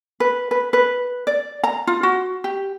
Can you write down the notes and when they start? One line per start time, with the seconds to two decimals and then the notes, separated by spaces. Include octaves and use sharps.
0.20 B4
0.51 B4
0.73 B4
1.27 D5
1.63 A#5
1.87 F4
2.03 F#4
2.44 G4